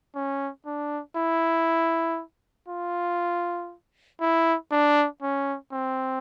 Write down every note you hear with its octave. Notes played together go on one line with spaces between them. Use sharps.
C#4
D4
E4
F4
E4
D4
C#4
C4